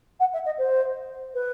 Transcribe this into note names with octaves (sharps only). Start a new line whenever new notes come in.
F#5
E5
D#5
C5
B4